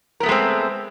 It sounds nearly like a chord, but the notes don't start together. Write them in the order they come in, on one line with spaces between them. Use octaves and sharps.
A#4 B3 A3 G#3 C4